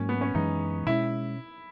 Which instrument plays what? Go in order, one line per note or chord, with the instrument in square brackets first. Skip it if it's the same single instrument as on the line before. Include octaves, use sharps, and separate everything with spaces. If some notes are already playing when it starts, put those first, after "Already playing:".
Already playing: [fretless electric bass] G#2 F#3 A#3 [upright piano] C#4
[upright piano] B3
C#4
[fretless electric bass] F#2 E3 G#3 B3 [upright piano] D#4
[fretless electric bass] B2 G#3 C#4 [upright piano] E4